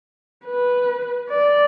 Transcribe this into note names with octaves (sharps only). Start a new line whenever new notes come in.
B4
D5